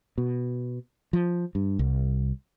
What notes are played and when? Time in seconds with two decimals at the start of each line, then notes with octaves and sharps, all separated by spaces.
0.18 B2
1.13 F3
1.55 G2
1.79 C2